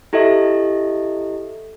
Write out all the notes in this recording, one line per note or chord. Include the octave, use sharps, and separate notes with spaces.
E4 G4 A4 D#5 E5